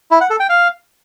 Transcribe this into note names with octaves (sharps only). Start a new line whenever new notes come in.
E4
F#5
A4
G5
F5